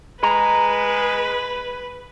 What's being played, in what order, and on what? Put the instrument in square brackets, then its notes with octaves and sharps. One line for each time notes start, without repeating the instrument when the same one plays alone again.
[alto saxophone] G#3 [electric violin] B4 [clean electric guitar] A#5